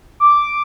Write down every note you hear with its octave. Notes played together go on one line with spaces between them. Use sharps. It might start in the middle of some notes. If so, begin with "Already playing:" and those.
D6